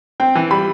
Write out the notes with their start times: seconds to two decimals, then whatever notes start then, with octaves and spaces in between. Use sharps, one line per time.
0.20 C4 G5
0.35 E3
0.51 G3 B5